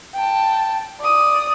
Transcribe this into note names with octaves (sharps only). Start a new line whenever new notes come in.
G5 A5
D5 D#6